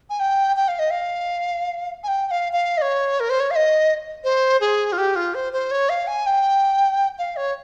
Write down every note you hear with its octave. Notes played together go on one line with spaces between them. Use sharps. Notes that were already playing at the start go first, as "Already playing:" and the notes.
G#5
G5
G5
F5
D#5
F5
G#5
G5
G5
F5
F5
D#5
C#5
A#4
C5
C#5
F5
D#5
C5
G#4
F4
G4
F4
C5
C5
C#5
F5
G#5
G5
F5
C#5